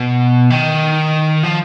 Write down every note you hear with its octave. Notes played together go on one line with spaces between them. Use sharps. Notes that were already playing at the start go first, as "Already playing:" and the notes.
Already playing: B2
D#3
F3